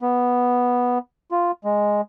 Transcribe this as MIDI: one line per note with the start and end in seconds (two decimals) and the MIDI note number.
0.01 0.98 59
1.31 1.51 65
1.64 2.01 56